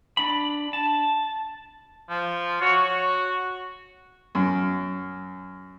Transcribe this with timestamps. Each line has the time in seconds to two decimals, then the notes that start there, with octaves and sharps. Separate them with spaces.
0.17 D4 B5
0.73 A5
2.10 F3
2.61 F#4 C#5
4.35 F#2